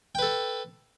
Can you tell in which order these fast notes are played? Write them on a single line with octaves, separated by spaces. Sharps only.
G5 B4 A4